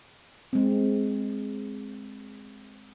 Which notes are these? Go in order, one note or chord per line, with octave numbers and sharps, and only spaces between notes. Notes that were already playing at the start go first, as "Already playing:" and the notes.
G#3 C4